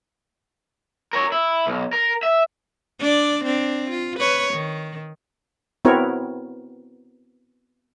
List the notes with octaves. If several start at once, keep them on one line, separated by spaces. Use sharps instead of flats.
A#4 C#5
E4
B1
A#4
E5
D4 D5
C4 D4
F4
B4 C#5
D#3
B3 C4 E4 F#4 A#4 C#5